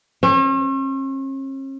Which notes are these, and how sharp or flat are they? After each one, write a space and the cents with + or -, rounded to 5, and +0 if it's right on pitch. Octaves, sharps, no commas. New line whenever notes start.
C#4 -45